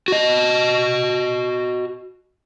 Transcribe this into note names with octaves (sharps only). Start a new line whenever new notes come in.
F#4 D#5